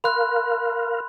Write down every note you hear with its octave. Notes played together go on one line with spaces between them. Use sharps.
A#4 F5 B5 C6 F#6